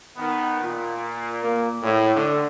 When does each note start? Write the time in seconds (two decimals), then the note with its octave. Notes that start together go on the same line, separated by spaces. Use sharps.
0.17 D#3 B3
0.61 A#2
1.43 A#3
1.82 A2
2.16 D3